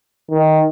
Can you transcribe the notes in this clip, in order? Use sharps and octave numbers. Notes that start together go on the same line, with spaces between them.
D#3